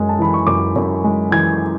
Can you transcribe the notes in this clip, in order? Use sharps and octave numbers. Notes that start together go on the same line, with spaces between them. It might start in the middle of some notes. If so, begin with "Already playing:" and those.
Already playing: F#2 G#3
A5
E3 B5
C#6
F#2 D6
F#2
G#3
E3 G#6